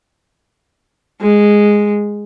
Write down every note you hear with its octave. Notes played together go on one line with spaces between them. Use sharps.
G#3